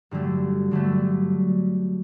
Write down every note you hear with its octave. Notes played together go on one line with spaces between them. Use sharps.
G2 D3 F#3 A3
G2 D3 F#3 A3